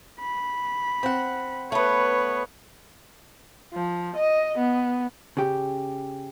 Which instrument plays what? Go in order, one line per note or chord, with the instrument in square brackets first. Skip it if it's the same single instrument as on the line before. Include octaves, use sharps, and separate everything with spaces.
[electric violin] B5
[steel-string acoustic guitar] C4 F#5
[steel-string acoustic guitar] A3 B3 [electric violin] B4 C#5
[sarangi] F3
D#5
B3
[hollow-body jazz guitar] C#3 G4